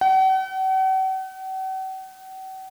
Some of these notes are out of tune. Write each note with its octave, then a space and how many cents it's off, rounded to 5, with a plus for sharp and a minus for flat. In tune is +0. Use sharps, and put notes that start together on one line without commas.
F#5 +45